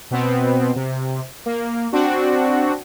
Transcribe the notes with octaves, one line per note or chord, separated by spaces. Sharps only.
B2 B3 C4
C3
A#3
C4 D4 F#4